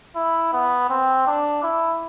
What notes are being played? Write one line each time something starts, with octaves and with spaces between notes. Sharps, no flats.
E4
B3
C4
D4
E4